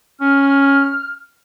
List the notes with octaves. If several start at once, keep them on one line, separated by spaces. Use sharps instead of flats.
C#4 F6